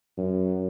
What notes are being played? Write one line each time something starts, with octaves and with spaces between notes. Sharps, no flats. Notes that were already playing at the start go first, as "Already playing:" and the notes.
F#2